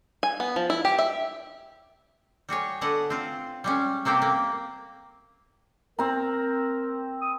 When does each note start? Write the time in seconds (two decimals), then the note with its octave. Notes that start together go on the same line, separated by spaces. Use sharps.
0.23 G#5
0.40 B3
0.56 F3
0.70 E4
0.85 G4
0.99 E5
2.49 G3 F#4 G#4 C#5
2.81 D3 B3 D#5 F#5
3.10 C4 F4
3.64 G3 G#3 C#4
4.05 C3 A#3 C4 G4 G5
4.22 A#3
5.99 C4 A#4 A#5
7.21 D#6